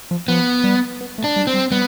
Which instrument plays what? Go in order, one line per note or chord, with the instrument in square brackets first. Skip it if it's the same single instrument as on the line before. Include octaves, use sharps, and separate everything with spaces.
[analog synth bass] F3
[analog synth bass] F3 [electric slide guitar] B3
[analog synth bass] G3
B3
A3
[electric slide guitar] D4
[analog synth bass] G3
[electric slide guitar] C4
[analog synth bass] G3
[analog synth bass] G3 [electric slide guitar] B3